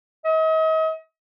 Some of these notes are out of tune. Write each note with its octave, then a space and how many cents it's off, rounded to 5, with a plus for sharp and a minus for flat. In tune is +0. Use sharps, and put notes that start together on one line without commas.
D#5 +40